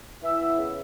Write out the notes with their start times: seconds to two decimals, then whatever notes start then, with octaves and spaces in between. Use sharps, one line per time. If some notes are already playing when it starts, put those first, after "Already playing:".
0.23 E3 E4 E5
0.41 B3
0.58 C#3